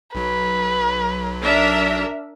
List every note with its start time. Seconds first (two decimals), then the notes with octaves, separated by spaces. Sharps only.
0.15 B1 F#3 B4
1.43 D4 A#4 E5